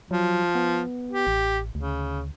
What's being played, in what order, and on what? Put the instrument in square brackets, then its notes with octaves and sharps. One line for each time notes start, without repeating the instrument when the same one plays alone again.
[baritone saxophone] F3 [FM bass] F#3
[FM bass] B3
[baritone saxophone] G4
[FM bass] A1
[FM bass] D2 [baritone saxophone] C#3